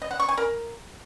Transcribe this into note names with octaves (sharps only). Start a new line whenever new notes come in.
D#5
F#5
C#6
G#5
A#4